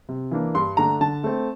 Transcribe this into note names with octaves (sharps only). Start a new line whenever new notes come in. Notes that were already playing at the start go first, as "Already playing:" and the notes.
C3
E3 A#3 D4
G2 C6
D3 A3 D4 A#5
D3 A5
A3 C4